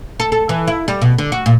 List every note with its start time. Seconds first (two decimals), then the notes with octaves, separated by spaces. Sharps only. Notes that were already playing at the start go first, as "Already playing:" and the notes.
0.20 A4
0.32 A4
0.49 E3
0.67 E4
0.88 G3
1.02 B2
1.18 D3
1.32 F#4
1.46 A#2